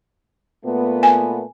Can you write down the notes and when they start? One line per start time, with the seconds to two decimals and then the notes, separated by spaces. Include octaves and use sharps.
0.65 A#2 A3 B3
1.03 G#5